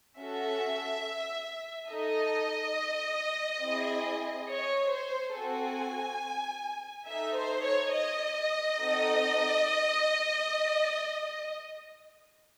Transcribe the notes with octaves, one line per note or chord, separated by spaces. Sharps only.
C#4 F#4 A4 E5
D#4 A4 D#5
C4 E4 G#4
C#5
C5
C4 F#4 A4 G#5
D#4 A4 E5
C5
C#5
D#5
C4 D#4 F#4 A4